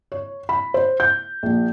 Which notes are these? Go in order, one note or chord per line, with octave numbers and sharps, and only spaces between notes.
C#5
B5
C5
G6
A#1